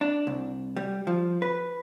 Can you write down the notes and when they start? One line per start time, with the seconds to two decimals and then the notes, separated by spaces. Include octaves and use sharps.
0.01 D4
0.27 C2
0.76 G3
1.07 F3
1.42 B4